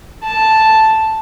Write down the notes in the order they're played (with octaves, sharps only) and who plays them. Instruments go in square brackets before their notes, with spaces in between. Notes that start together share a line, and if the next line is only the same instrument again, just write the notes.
[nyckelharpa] A5